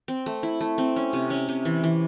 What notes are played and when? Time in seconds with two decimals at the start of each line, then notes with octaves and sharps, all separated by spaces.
0.08 C4
0.26 A3
0.43 E4
0.61 A3
0.78 C4
0.96 C#4
1.13 C3
1.30 C#4
1.49 C3
1.65 E3
1.84 E3